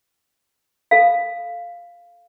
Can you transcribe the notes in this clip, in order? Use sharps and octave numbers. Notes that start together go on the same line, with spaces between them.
A4 F5